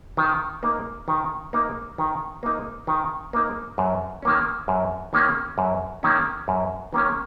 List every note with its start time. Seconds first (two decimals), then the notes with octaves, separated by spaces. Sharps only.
0.17 D#3
0.63 A#3 D#4
1.08 D#3
1.53 A#3 D#4
1.98 D#3
2.43 A#3 D#4
2.87 D#3
3.33 A#3 D#4
3.78 F#2
4.22 D#3 A#3 C#4
4.68 F#2
5.13 D#3 A#3 C#4
5.58 F#2
6.03 D#3 A#3 C#4
6.48 F#2
6.93 D#3 A#3 C#4